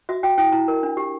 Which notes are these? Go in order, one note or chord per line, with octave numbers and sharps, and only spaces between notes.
F#4 E5
F#4 G5
E4 G5
E4 A#5
A#4
D4
G4